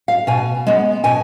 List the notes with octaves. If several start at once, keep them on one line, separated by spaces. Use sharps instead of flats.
F5
B2 G#5
G#3 B3
B2 G#5